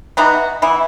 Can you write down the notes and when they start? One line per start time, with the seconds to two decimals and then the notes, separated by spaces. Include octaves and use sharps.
0.17 E3 B3 D#4 F#4
0.62 E3 B3 E4